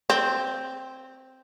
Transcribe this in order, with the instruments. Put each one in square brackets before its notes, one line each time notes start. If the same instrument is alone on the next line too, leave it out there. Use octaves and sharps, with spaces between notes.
[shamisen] C4